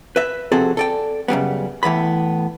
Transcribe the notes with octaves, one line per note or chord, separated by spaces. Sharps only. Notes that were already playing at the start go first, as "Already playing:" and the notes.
B4 E5
C3 F3 C4 F#4 G#4 A4
A4 D5 G5
F#2 C#3 G3 B3
A2 E3 B3 B5